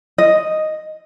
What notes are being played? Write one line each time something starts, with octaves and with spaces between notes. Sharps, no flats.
D#5